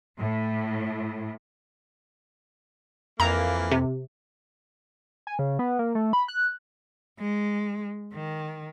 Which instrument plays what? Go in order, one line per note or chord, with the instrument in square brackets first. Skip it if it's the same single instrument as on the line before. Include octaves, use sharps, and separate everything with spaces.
[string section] A2
[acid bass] F2 [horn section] E3 F3 A#3 [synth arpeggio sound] A#5
[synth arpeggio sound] C3
[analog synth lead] G#5
C#3
B3
A#3
A3
B5
F#6
[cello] G#3
D#3